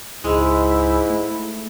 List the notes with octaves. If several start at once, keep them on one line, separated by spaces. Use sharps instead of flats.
C#2 G#2 G#3 E4
A3